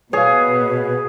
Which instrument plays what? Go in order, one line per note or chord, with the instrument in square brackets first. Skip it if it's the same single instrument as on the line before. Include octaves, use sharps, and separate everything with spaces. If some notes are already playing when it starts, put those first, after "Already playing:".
[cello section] B2 [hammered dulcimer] G#4 [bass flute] B4 [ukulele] C#5 F5